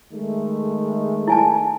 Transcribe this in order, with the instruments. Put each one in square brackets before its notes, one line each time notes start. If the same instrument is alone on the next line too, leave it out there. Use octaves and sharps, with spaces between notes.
[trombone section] D#3 G#3 A3
[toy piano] E4 G#5 A5